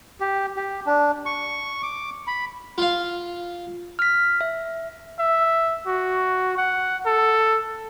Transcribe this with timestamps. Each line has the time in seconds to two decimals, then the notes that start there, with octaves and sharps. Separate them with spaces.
0.20 G4
0.56 G4
0.86 D4
1.26 C#6
1.83 D6
2.27 B5
2.78 F4 F5
3.99 F6 B6
4.41 E5
5.19 E5
5.86 F#4
6.57 F#5
7.05 A4